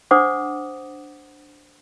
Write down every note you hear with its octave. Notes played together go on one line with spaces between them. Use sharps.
D4 C5 F#5 D6 D#6